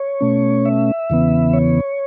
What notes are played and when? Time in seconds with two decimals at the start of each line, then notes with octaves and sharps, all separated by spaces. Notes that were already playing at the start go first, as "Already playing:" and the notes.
Already playing: C#5
0.21 B2 A3 C#4
0.65 E5
1.10 E2 C#3 E3 B3
1.53 C#5